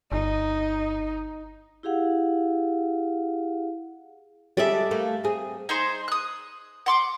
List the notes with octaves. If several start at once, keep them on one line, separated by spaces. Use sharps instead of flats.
G1 D#4
E4 G4 G#4 F5 F#5
D3 G3 G#3 D5 E5
A3 A#3
C4 G#4
D#4 G#4 C5
D#6 F#6
F#5 C6 D6